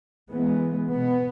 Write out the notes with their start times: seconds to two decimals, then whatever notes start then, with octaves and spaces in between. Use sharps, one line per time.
0.31 E3 G#3 B3
0.90 B2 B3